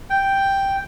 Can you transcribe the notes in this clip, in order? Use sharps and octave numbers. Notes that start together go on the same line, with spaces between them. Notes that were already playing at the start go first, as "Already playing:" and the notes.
G5